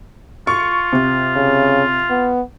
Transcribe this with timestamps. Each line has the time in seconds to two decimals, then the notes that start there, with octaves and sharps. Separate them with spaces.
0.47 F4 C#6
0.93 C3
1.36 C#3
2.10 B3